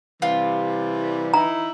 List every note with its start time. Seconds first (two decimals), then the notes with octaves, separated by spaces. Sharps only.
0.22 C3 E3 G3 F4
1.34 D#4 E4 A#5